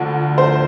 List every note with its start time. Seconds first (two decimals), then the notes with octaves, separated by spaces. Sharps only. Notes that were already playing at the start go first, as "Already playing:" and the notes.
Already playing: D2 D3 F3
0.38 C5